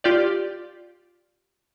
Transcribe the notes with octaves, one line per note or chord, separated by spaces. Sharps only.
F4 G4 D5